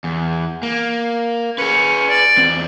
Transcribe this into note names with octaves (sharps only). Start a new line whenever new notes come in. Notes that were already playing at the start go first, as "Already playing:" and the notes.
E2
A#3
C#4 G#4 B4
D5
E2 C4